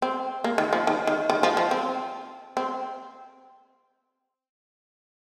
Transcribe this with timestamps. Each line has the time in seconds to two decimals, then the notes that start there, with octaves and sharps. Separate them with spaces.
0.02 C4
0.44 A#3
0.58 D#3
0.73 F3
0.87 D#3
1.07 D#3
1.30 D#3
1.43 F3
1.57 F3
1.71 C4
2.57 C4